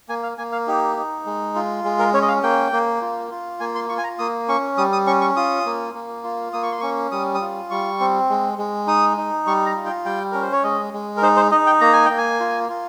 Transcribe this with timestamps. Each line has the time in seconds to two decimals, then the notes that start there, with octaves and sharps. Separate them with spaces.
0.09 A#3 G#5
0.23 F5
0.38 A#3 G#5
0.52 F5
0.67 D#4 G4
0.97 D#4
1.26 G#3
1.55 F4
1.84 G#3
1.99 A#4
2.14 C#4 C#5
2.22 D#5
2.28 F5
2.43 A#3 G5
2.72 A#3
3.02 F4
3.31 F4
3.60 A#3 G#5
3.75 C6
3.89 F4 C#6
3.98 G#5
4.04 A#5
4.19 A#3 D#6
4.48 C#4 C#6
4.77 G3 D#6
4.93 D#6
5.07 C#4 C#6
5.21 C#6
5.36 F4 D#6
5.66 A#3
5.95 A#3
6.24 F4
6.53 A#3 D#6
6.63 C#6
6.72 C6
6.80 C#4 C#6
7.12 G3 D#6
7.35 D#6
7.41 F4
7.71 G3 C#6
8.00 C4
8.29 G#3
8.58 G#3
8.87 D#4 D#6
9.17 D#4
9.46 G3 C#6
9.66 A#5
9.76 F4
9.85 G5
10.05 G3 G5
10.32 C#4 A#4
10.42 C5
10.52 C#5
10.63 G#3 D#5
10.93 G#3
11.17 A#4
11.22 D#4 C5
11.37 C5
11.51 D#4 D#5
11.66 G5
11.81 A#3 A#5
11.93 G#5
12.06 A#3 G5
12.18 G#5
12.40 F4
12.69 F4